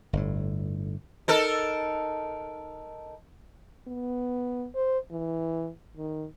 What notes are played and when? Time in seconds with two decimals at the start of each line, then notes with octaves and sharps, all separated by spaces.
0.13 G1 A2
1.28 D#4 A4 A#4
3.88 B3
4.75 C5
5.11 E3
5.97 D#3